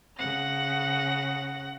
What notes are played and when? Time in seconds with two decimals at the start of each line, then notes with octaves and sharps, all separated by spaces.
0.17 C#3 F#5 A#6